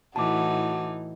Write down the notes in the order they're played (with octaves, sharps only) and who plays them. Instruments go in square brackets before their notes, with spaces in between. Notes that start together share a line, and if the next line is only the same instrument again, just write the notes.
[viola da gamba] A2 E3 D#4 [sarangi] F#4 [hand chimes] A5 D6